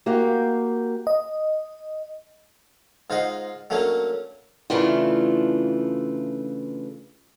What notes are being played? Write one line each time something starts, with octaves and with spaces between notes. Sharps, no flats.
A#3 F#4 G4 F5
D#5
G#2 F4 C5 D#5 F#5
F#3 A3 A#3 C#4 D4
C#3 E3 A3 D4 F4